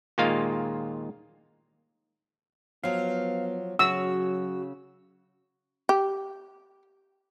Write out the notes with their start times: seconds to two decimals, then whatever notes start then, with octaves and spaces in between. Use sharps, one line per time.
0.18 D#2 A#2 G#3 A#3 F4 F5
2.84 F3 F#3 B3 F5
3.79 C#3 F#3 F#4 E6
5.89 G4